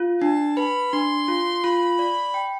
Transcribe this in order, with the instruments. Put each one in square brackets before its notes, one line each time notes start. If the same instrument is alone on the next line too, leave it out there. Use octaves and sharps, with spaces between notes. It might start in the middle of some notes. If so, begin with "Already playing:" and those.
Already playing: [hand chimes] F4
[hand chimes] D4 [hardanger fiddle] A5
[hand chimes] B4 [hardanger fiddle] B5
[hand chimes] D4 [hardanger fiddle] C6
[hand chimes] F4
[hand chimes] F4 [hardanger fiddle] B5
[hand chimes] D5
G5